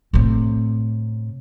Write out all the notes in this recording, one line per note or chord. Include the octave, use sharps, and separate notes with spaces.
A2 C3